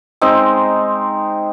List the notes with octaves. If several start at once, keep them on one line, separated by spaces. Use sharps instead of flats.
G#3 C4 D#4